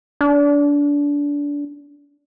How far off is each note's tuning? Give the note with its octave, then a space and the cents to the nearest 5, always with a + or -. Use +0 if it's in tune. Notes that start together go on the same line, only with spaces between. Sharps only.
D4 -25